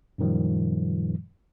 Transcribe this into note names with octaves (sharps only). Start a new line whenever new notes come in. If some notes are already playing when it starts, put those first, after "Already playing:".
F#2 A#2 D#3 F3 G3